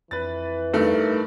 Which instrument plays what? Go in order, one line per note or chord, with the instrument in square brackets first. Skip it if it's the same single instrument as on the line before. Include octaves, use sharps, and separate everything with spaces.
[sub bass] F2 [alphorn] E3 [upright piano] B4 A6
[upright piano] G2 A3 [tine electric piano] D#4 A4 A#4